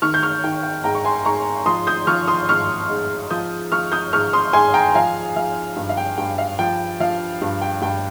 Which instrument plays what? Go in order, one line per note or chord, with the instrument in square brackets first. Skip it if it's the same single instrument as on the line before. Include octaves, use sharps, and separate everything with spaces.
[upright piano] D#3 C#6 F6
G6
C#6 F6
D#3 G5
G5
G#2 G5 A#5
C#6
G#5 C6
G#2 A#5 C#6
F3 C6 D#6
D#6 G6
F3 C#6 F6
C6 D#6
G#2 C#6 F6
G#2
F3 D#6 G6
F3 C#6 F6
D#6 G6
G#2 C#6 F6
C6 D#6
G#2 G#5 C6
G5 A#5
F3 F5 G#5
F3 F5
G2
F5
G5
G2 G5
F5
F3 G5
F3 F5
G2
G5
G2 G5